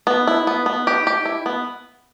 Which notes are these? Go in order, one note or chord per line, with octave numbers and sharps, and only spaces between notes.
B3
E4
B3
B3
G4
G4
E4
B3